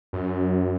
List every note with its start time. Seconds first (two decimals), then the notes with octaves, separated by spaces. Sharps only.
0.13 F#2